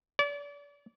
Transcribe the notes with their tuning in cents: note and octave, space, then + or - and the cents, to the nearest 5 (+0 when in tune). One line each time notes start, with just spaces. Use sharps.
D5 -35